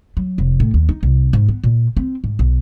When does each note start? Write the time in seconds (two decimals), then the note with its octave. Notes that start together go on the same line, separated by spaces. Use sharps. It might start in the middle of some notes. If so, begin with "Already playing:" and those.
0.17 F#3
0.38 F1
0.60 A2
0.74 D#2
0.89 D#4
1.03 C2
1.33 G#2
1.49 B3
1.64 A#2
1.97 C4
2.24 G#2
2.39 B1